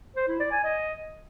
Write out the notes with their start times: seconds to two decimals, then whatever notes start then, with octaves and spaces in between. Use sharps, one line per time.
0.16 C5
0.28 E4
0.40 D5
0.52 G#5
0.63 D#5